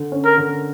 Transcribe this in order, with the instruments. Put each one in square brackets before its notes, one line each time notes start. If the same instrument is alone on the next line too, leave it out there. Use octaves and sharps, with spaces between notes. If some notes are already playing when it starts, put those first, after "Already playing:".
Already playing: [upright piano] D3
C#4
[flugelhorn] A#4
[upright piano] D3